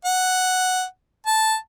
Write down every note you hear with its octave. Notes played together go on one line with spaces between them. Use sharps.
F#5
A5